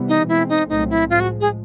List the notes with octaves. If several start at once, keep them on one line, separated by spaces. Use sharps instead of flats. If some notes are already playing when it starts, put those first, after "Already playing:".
Already playing: C3 E3 G3 B3
D#4
B2 G#3 C4 E4
D#4
C2 A#2 F#3 A3 C4 D#4
E4
A2 F3 G#3 F4
F#4
G#4